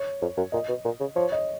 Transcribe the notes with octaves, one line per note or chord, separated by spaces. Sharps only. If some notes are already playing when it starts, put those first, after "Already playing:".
Already playing: C#5
F2
F#2
A#2 D#5
B2
A#2
C#3
F3 C#5
D#5